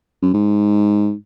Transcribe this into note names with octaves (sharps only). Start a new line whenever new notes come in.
F#2
G#2